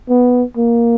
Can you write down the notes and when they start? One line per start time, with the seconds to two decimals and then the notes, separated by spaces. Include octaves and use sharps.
0.09 B3
0.57 A#3